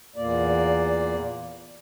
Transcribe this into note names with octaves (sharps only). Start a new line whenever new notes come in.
E2 A#2 A#3 D5